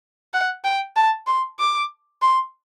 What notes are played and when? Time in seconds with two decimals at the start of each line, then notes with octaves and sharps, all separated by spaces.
0.34 F#5
0.64 G5
0.96 A5
1.27 C6
1.59 D6
2.22 C6